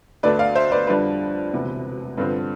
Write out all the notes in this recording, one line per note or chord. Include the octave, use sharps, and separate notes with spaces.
D2 D3 A3 D4 B4 D5
D5 F5
C5 E5
B4 D5
F2 D3 G3 D4 B4
E1 D2 C3 E3 B3
G2 D3 F3 C4 B4